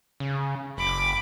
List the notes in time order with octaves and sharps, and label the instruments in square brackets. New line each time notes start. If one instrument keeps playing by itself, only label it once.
[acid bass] C#3
[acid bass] F#1 [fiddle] B5 D6